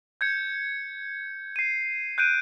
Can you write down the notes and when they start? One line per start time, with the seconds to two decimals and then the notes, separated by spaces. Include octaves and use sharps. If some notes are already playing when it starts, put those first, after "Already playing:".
0.21 G6 G#6 C#7
1.56 C7 D#7
2.18 F#6 G6 D7 D#7